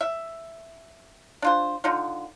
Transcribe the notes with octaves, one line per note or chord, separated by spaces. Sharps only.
E5
D4 F4 C5
D3 D#4 F4